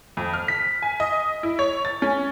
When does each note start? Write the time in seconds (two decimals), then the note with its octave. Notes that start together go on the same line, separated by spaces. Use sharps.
0.17 F2
0.34 F6
0.48 B6
0.82 G#5
1.00 D#5
1.43 E4
1.59 C#5
1.85 A6
2.02 C#4